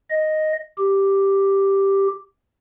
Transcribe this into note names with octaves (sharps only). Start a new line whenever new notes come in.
D#5
G4